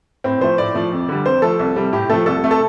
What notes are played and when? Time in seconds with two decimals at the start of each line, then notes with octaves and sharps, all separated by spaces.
0.24 A2 C4
0.41 F3 A3 C5
0.58 A2 D5
0.74 F3 A3
0.92 F2
1.09 D3 G3
1.25 F2 C5
1.42 F3 A3 A4
1.59 C2
1.76 C3 G3
1.92 A2 G4
2.09 F3 A3 A4
2.26 C2 A4
2.44 C3 A3
2.51 A4